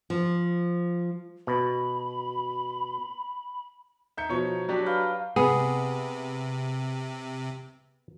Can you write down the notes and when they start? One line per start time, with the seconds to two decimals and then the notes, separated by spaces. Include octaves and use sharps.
0.10 F3
1.47 B2 B5
4.17 D#4 E5 G6 C#7
4.29 B2 F3 C#5
4.69 F#3 D4 G4
4.86 B4 F5 G5
5.36 C3 B3 G#4